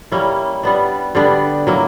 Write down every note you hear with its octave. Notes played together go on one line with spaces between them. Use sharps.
G3 A#3 C#4 E4
G3 B3 D4
D3 G3 B3 D4
F#3 A#3 E4